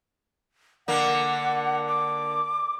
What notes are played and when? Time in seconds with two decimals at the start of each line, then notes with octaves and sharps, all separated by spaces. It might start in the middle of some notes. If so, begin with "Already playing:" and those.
0.88 D3 A#3 F#5
1.88 D6